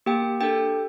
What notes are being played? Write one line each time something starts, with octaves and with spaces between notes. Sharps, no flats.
A#3 G4 G5
D4 G4 A4 G5